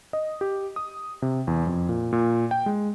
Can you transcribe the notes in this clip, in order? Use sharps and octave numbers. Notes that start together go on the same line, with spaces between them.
D#5
G4
D#6
C3
E2
F2
A#2
A#2
G5
G#3